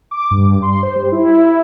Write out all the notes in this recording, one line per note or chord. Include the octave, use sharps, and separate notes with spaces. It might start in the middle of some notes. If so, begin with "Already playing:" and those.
D6
G2
C6
C5
G3
E4